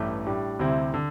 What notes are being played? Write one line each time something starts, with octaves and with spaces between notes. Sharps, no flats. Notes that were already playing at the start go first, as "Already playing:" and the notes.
Already playing: A1 G2 E3 A3
A2 G3 D4
D2 C3 G3 C4 E4
D3